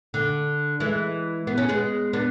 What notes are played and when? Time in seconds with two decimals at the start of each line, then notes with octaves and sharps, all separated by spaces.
0.14 D3
0.80 E3 G#3
1.47 B3
1.58 C#4
1.68 G#3 B3
2.13 B3 D4